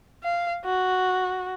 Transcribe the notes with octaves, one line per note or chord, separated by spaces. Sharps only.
F5
F#4